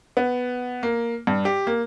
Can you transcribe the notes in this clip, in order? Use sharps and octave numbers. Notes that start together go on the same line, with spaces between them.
B3
A#3
G2
G4
A#3